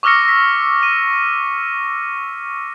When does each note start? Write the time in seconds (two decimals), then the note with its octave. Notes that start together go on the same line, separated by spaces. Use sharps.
0.03 C#6 D6 E6 F6 A#6 C#7
0.24 A#6 B6
0.83 D#7